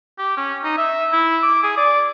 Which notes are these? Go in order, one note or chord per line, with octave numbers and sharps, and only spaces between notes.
G4
C#4
D#4
E5
E4
D6
G#4
D5